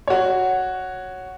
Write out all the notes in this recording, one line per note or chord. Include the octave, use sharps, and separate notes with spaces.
F#4 C#5